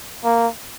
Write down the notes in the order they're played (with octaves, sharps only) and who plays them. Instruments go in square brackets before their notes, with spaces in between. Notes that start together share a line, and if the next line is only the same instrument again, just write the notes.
[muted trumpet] A#3